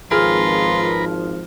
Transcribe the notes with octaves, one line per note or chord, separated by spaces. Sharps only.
G#1 F3 F4 G#4 A#4 B4 F6